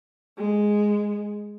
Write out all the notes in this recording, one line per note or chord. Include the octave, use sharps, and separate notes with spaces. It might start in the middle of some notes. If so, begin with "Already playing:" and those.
G#3